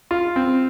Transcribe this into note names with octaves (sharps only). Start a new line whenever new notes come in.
F4
C4